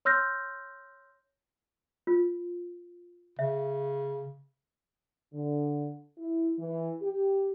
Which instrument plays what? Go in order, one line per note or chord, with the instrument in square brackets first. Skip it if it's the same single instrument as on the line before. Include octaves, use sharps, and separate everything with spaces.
[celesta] C#5 C6 E6 F6 G6 A#6
[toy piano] F4
[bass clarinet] C#3 [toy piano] E5
[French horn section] D3
E4
E3
G4